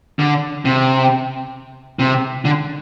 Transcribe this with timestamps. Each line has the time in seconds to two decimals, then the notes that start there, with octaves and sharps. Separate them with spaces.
0.19 D3
0.65 C3
1.99 C3
2.45 D3